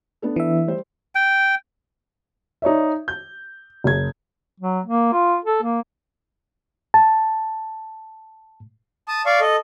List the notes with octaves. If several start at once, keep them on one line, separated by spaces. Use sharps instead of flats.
B3 D4 A4
E3 E5
G3 C5
G5
D#4 C#5 D5 E5
G6
F#1 G#6
F#3
A#3
F4
A4
A#3
A5
A5 D#6
D5 F5 C#6
A4 D#5